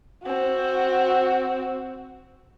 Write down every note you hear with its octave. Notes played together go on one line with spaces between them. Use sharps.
C4 F#4